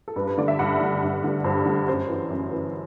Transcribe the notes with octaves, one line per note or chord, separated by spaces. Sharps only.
A4
G2 B4
B4
D3 D5
E5
G2 F#5
D3
G2
D3
G2 C5
D3
F#2 C5
E3
F#2
E3